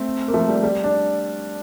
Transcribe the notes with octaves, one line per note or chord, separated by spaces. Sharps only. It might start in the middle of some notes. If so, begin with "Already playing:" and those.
Already playing: A3 C4
A#3
F3 A3
G3
G3
D4